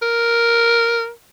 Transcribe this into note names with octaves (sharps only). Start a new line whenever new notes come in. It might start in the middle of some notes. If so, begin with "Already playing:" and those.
A#4